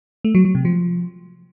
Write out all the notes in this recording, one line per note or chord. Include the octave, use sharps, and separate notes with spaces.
A3
F#3
F#3
C3
F3